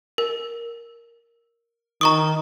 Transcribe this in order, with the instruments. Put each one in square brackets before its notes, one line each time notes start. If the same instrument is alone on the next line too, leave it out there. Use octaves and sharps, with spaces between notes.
[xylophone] A#4
[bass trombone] D#3 [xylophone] A#5 C#6 D#6